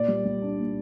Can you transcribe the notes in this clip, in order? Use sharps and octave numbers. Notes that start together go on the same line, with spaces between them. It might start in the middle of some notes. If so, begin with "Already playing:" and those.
Already playing: A#2 D5
G3
G3
D4
A#2